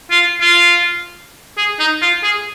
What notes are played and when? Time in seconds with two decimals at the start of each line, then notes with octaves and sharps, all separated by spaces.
0.11 F4
0.41 F4
1.58 G#4
1.79 D#4
2.02 F4
2.23 G#4